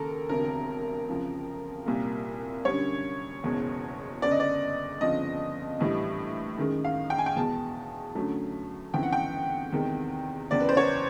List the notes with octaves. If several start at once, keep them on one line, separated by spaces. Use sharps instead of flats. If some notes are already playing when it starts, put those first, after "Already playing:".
Already playing: D#2 C#3 A4 A#4
E1 D2 C3 A#4
F2 C#3 F3
C2 A#2 G3 A#3
F#2 D3 G3 C#5
F#1 E2 B2 G#3
G1 F#2 C#3 D5
D#5
D5
G1 F2 C#3 F3 D#5
A#1 A2 E3 G3
F#2 D#3 G#3
F5
G5
G#5
G5
E2 B2 G#3 A5
F#2 D3 F#3 A3
G1 F2 C#3 E3 G5
F#5
G5
E2 C3 D#3 G#3
F#1 E2 C#3 D5
B4
C5
C#5